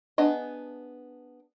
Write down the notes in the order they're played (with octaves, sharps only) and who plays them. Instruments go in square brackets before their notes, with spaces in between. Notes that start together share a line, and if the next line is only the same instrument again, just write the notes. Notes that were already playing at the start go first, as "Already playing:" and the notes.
[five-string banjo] B3 D4 G#4 D#5